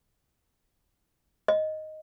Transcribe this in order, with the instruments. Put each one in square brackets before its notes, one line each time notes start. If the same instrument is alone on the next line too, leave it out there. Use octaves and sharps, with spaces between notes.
[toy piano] D#5